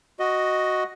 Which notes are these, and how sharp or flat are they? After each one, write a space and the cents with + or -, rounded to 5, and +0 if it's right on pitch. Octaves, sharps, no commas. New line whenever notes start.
F#4 +0 D#5 +0